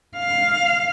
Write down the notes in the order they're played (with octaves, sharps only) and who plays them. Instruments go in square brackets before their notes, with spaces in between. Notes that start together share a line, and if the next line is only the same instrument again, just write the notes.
[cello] F5